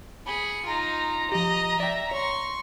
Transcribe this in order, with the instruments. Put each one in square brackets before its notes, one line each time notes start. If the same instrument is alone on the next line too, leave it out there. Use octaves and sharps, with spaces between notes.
[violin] G#4 C#7 [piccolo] B5
[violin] D#4 F4 [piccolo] A#5
[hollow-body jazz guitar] F3 G4 [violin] D#5
[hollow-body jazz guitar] D5 G5 [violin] E5
[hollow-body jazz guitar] C#5 [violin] C6 C#6